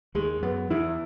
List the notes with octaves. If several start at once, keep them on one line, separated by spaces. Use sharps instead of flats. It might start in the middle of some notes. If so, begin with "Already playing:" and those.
D#2 D#3 G#3
F#2 F#3 B3
E2 E3 E4